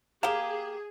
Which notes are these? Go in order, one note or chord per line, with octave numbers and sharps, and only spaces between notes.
A#3 G4 G#4 F5 E7